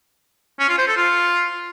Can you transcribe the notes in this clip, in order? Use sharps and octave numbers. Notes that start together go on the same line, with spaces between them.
C#4
F4
C5
A4
F4